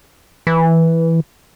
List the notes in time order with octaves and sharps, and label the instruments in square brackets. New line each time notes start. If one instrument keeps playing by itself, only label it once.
[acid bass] E3